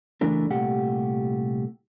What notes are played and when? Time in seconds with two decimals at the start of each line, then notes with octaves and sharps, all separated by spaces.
0.21 C#2 E3 A3 D4 A#4
0.50 C2 A#2 A3 G4 F#5